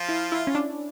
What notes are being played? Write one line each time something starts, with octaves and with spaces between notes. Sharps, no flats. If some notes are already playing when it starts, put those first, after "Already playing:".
Already playing: F3 F4
E4
E4
C#4
D4